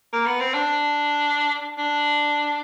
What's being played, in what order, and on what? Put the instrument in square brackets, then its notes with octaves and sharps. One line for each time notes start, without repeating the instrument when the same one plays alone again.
[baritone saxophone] A#3
B3
C4
D4
D4